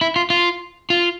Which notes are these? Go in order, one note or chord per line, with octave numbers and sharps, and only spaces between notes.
E4
F4
F4
F4